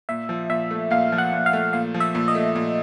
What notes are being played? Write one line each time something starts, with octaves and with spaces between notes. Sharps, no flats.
A#2 E5
F3
A#2 E5
A3
A#2 F5
F3
F#5
A#2
F5
A3
A#2 F5
F3
E5
A#2
D#5
A3
A#2